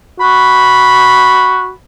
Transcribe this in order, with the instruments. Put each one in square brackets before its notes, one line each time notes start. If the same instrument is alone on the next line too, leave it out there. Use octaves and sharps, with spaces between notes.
[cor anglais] F#4 [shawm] B5